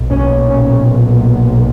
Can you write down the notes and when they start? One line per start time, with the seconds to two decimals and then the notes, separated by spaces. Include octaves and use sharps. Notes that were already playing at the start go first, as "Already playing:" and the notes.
Already playing: B1 A#2
0.09 C#4
0.48 C#4